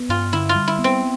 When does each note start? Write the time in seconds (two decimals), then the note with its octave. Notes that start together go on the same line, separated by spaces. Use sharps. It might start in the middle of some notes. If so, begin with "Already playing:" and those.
Already playing: B3
0.09 G2 F4
0.33 D3 E4
0.49 F4
0.55 G3
0.68 E4
0.79 B3
0.84 C4